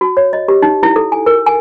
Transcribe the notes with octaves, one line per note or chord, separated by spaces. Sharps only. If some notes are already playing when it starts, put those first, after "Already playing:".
F#4
C#5
D#5
G4
D#4
E4
A4
G#5
A#4
G#5